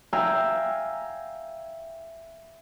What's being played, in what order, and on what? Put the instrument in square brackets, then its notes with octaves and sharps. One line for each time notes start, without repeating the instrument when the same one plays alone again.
[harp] E5 F5 G5 G#5 A#5 E6